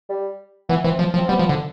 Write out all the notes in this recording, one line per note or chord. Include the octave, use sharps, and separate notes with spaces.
G3
E3 B3
E3 C4
F3
F3
C4
G3 B3
F3
D3